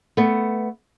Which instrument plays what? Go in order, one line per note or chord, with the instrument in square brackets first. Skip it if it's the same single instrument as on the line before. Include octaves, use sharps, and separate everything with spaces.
[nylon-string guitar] A3 B3